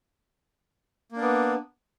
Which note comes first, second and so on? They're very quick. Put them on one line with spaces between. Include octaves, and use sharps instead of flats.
A#3 D4 B3